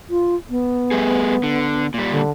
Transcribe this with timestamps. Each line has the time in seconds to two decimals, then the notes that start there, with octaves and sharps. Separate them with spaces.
0.10 F4
0.50 B3
0.91 G3 A3 G#4
1.43 D3
1.94 A#2 G3
2.11 D3